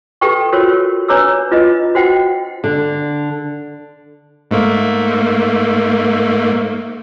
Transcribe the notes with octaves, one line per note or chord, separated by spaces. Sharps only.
G4 A4 B4 G5 C#6
F4 F#4 A#4 C5 C#5
D4 B4 C#5 A#5 D6 E6
E4 F4 B4 D#5
F#4 C5 F#5 G5
D3
G#2 A3 A#3